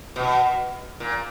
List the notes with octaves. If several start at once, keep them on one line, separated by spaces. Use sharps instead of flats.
B2
A#2